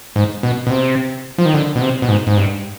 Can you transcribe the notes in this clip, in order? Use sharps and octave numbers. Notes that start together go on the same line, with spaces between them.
G#2
B2
B2
C3
F3
D#3
D3
B2
C3
B2
G#2
G#2
G2